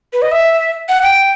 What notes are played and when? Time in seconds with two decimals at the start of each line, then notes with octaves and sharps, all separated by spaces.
0.13 B4
0.22 D#5
0.32 E5
0.89 F#5
1.02 G5